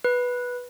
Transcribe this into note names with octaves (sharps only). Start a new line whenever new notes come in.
B4